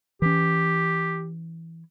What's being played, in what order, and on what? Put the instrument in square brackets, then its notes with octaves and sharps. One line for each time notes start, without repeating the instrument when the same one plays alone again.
[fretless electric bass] E3 C#4 [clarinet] G4